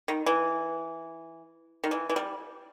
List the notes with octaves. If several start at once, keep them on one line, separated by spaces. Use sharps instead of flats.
D#3
E3
D#3
E3
E3
G3